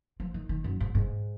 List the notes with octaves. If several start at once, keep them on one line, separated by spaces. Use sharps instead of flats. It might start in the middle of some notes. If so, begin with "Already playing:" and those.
F3
D#3
D#3
F#2
G#2
G#2